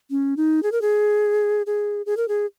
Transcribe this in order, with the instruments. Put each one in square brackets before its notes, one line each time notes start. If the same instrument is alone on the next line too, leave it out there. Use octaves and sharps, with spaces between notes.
[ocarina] C#4
D#4
G#4
A#4
G#4
G#4
G#4
A#4
G#4